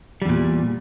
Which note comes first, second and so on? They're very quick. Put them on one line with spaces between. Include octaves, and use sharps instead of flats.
G3 E2 A#2